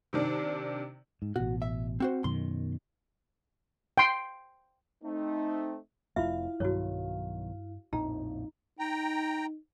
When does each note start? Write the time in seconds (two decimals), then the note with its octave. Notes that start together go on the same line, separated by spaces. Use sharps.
0.13 C3 D#3 D4
1.22 G#2
1.36 A1 B2 F#4
1.62 E5
2.00 C4 F#4 C5
2.24 F#2 B2 D#3 C6
3.98 G5 C6
5.03 A3 C4 D#4
6.16 F1 F2 A3 E4 F4 E5 F5
6.60 B1 G2 D#3 F#3 F#4 C#5
7.93 A#1 F2 A2 D#4 A#5
8.79 D#4 G5 A#5